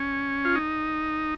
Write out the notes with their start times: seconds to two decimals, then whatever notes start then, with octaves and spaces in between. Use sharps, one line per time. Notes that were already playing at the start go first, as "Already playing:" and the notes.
Already playing: C#4
0.45 F4
0.55 D#4